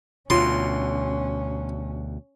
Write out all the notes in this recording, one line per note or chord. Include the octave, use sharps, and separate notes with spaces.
D2 B2 C#4 F4 C#5 B5 C6